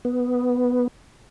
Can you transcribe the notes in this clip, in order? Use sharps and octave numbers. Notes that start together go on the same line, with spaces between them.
B3